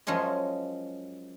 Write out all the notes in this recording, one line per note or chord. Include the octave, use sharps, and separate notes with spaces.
F#2 F3 G#3 C#4 D#5